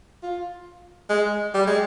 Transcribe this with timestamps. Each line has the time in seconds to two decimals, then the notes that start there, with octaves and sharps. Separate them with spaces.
0.23 F4
1.10 G#3
1.54 G3
1.67 G#3